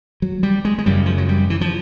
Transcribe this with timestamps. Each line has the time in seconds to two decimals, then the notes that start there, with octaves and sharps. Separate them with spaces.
0.22 F#3
0.43 G3
0.65 G#3
0.78 G#3
0.86 F#2 C#3 G3
1.06 F3
1.18 F#3
1.29 G3
1.50 E3
1.61 F3